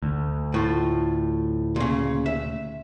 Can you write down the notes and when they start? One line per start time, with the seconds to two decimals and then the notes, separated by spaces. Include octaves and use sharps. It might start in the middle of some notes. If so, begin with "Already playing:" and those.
0.03 D2
0.54 A2 F4
1.76 A#2 C#3
2.26 E5